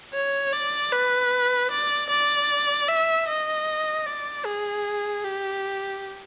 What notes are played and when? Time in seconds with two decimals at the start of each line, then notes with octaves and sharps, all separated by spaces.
0.13 C#5
0.53 D5
0.92 B4
1.71 D5
2.09 D5
2.88 E5
3.28 D#5
4.07 D5
4.46 G#4
5.24 G4